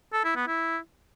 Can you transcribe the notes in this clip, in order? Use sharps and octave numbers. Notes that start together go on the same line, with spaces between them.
A4
E4
B3
E4